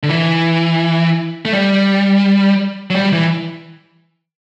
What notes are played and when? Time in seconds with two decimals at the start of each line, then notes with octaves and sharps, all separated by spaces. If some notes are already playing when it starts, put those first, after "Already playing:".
0.03 D3
0.09 E3
1.45 A3
1.53 G3
2.90 F#3
2.95 G3
3.13 E3